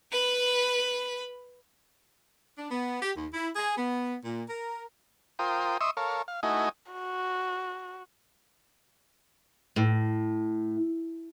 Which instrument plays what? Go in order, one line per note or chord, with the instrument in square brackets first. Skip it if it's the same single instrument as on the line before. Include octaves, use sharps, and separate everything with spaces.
[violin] B4 B5
[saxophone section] D4
B3
G4
D#2
E4
G#4
B3
A#2
A#4
[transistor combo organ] F4 A#4 C5 G5 D#6
D#5 E5 C6 C#6 D#6 E6
A4 A#4 C#5 F5
F5
A3 D#4 E4 F#4 D#5 G#5
[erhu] F#4
[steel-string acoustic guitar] A2